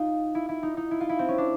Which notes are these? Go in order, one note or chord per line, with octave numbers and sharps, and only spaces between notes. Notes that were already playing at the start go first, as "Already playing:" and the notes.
Already playing: D#4 F4
E4
E4
D#4
D#4
E4
F4
E4
C4
C#4
D4